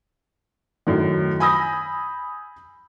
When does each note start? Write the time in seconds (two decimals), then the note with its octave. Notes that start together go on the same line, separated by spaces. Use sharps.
0.87 F#2 A2 D#3
1.40 G#5 B5 D#6 E6 G6 A#6